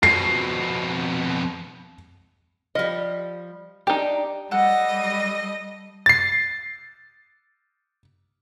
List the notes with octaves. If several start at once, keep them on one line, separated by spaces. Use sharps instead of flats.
F2 B2 C7
F3 G3 D#5
D4 D#4 G4
G3 A4 D#5 F#5
A6 C7